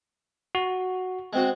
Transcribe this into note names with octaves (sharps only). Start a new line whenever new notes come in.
F#4
G#3 C4 F#4